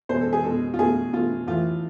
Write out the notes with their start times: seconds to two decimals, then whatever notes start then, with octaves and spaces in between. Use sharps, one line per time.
0.09 B2 G#3 C5
0.21 A4
0.33 G#4
0.44 B2 G#3 A4
0.74 F4
0.78 B2 A3 G#4
1.13 B2 A3 F4
1.47 A2 E3 A3 F4